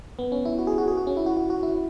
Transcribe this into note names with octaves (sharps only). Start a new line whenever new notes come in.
B3
C#4
E4
F#4
G#4
F#4
G#4
F#4
C#4
E4
F#4
F#4
F#4
E4